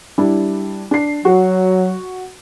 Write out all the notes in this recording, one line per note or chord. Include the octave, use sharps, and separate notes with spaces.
G3 D4 E4
D4 C7
F#3 F#4